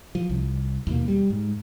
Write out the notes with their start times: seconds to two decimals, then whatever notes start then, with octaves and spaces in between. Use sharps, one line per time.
0.15 F3
0.29 C2
0.87 D#2 B2 A#3
1.08 G3
1.30 G#2